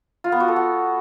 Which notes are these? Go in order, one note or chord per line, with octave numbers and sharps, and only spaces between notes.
F4
B3
F#4
A4
F#4